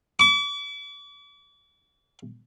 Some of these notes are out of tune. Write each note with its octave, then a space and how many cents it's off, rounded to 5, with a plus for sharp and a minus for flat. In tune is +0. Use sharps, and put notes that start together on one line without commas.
D6 -40